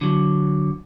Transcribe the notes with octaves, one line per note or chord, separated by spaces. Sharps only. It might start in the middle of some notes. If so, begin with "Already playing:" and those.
D3 F#3